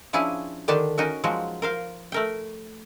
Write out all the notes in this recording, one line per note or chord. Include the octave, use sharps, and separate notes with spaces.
F3 C#4 D4 E4 G#4
D3 D#3 D4 G4 A5
C#4 D#4 F#4 A#4
F3 F#3 G#3 F#4
A#4 C5 F5
A3 A#4 G5